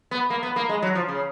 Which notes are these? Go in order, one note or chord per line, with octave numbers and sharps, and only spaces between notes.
B3
A#3
B3
A#3
G#3
F#3
F3
C#3